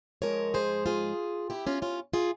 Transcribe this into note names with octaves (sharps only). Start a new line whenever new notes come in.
G#2 F3 G#3 A#4 C#5
G#4 C5
F4 G#4
E4 G4
C#4 F4
C#4 F4
F4 G#4